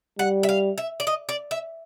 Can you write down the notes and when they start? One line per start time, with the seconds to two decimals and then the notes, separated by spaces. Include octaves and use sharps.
0.19 G3 F#5
0.43 E5
0.49 F5
0.78 E5
1.00 D5
1.07 D#5
1.29 D5
1.51 E5